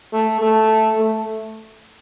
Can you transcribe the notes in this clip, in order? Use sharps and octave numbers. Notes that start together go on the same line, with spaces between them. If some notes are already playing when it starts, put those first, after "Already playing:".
A3
A3
A3